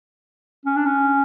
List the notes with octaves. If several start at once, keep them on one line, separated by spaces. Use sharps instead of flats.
C#4
D4
C#4